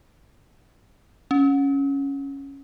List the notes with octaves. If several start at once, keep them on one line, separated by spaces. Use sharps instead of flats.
C#4